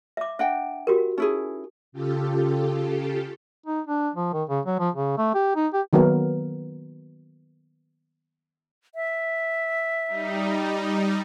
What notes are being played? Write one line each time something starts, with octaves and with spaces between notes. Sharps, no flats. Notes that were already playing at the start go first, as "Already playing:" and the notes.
E5 D6
D4 E5 F#5 G5
F#4 G4 A#4
C#4 D#4 E4 G#4
C#3 F4 G4 A4
D#4
D4
F3
D#3
C#3
F#3
F3
C#3
A3
G4
D#4
G4
D#3 F#3 A#3 B3 A#4
E5
G3 D#4